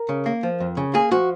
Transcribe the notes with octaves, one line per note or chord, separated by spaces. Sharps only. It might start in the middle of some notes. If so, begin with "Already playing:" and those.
Already playing: A#4
C#3
A#3
F3
F2
C#3
A#3 G#4
F3 F#4